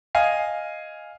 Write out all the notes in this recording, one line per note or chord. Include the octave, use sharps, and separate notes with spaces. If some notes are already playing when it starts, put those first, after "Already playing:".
D#5 F5 G#5 C7